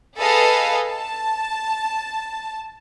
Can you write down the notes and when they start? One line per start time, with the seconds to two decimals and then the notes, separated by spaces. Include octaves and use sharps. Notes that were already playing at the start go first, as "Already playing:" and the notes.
0.16 G#4 A4 B4 D#5 F5
0.88 A5